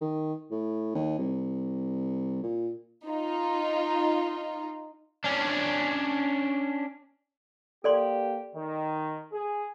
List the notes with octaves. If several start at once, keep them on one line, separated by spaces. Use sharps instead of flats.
D#3
A2
D#2
C2
A#2
D#4 F4
C#4 D4
A#3 G4 A4 D5 C6
D#3
G#4